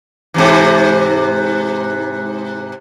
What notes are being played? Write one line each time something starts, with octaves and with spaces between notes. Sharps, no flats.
G#2 C3 E3